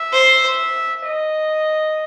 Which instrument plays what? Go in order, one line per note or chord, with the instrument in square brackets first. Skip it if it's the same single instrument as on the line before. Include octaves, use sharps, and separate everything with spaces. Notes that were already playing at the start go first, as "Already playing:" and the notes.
Already playing: [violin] E5
[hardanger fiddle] C5
[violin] D#5